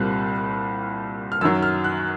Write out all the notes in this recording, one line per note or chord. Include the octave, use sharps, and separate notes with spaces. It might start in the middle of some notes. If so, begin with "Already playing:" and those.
Already playing: C2 A#2 G3 C4 F#6
F6
F#2 D#3 F#3 E6
F6
F#6